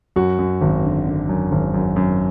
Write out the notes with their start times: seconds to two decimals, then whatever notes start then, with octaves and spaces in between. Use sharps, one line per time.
0.16 F#2 F#4
0.39 F#2
0.61 G#1
0.84 D3
1.07 D3
1.29 F#2
1.52 G#1
1.74 F#2
1.96 F#2